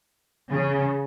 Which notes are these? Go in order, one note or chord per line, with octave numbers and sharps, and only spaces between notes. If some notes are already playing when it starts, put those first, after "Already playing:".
C#3